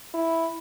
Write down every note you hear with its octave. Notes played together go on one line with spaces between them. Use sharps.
E4